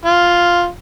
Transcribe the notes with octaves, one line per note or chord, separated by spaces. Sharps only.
F4